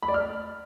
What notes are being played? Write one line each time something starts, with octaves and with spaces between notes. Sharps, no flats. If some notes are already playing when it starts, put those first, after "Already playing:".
B5
D5
F6